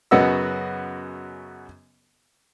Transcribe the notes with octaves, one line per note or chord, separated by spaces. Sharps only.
F#2 C#3 B3 F#4 D#5 E6